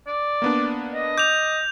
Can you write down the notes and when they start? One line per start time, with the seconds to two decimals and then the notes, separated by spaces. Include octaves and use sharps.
0.07 D5
0.42 A#3 B3 D4
0.93 D#5
1.18 D6 G6 F7